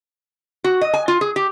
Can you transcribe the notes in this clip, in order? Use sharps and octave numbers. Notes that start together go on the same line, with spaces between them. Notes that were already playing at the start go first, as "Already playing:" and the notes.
F#4
D#5
G#5
F4
G#4
G4